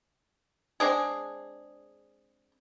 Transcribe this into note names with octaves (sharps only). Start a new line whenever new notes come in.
G#3 C4 D4 G#4